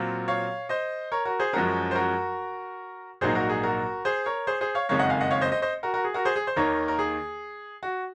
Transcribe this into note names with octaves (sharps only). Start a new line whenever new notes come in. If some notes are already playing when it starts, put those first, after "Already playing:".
Already playing: A#2 F#3 C4 F4
C#5 F5
C5 D#5
A#4 C#5
F#4 A#4
G#4 C5
F#2 F3 G#3 C#4 F#4 A#4
C5
F#4 A#4
A#1 G#2 F#3 A#3 D#4 G#4 C5
F#4 A#4
G#4
F#4 A#4
G#4 C5
A#4 C#5
G#4 C5
G#4 C5
C#5 F5
F#1 F2 D#3 G#3 D#4 C#5 F5
D#5 F#5
F5 G#5
D#5 F#5
C#5 F5
C5 D#5
C5 D#5
C5 D#5
F#4 A#4
F#4 A#4
G#4
F#4 A#4
G#4 C5
G#4
C5
D#2 D#3 A#3 D#4 A#4 C#5
A#4
G#4
F#4